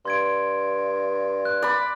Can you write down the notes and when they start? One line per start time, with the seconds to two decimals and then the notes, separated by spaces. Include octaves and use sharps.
0.05 G2 C6 G#6 D7
1.45 F#6
1.62 D5 B5